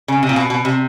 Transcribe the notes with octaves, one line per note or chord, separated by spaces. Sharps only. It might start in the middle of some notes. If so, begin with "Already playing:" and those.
C#3
C3
A#2
B2
B2
C3